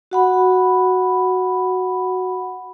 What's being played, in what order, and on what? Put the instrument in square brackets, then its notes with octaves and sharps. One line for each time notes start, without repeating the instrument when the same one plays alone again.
[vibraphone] F#4 F#5 B5